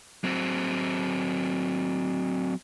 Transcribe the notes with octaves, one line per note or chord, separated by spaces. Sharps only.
F#3 C4